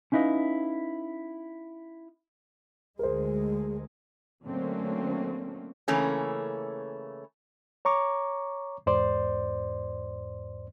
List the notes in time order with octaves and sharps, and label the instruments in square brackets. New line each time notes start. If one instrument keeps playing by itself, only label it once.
[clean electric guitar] C#4 D#4 E4 B4 D#5 F5
[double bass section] D2 G#3 [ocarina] G#4 [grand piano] A#4 C5
[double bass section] D3 F#3 A3 A#3 C4 C#4
[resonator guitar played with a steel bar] C#3 E3 A3 A#3 C#4
[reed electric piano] C#5 A#5 C#6 D6
E2 G#2 C5 D5 C6